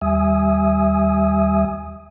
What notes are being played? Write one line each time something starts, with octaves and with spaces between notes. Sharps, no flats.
D#2 G3 E5 G#5 D#6